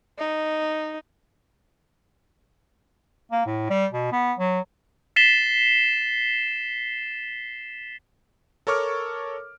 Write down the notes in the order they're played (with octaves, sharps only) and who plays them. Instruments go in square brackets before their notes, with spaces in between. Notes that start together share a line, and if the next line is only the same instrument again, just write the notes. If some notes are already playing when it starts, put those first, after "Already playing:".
[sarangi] D#4
[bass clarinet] A#3
A2
G3
B2
B3
F#3
[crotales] A6 B6 C7 E7 G7
[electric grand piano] A4 A#4 C#5 C#6 D6 F6